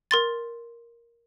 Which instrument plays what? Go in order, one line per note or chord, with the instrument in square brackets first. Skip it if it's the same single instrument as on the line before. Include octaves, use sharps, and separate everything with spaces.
[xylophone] A#4 C6 A6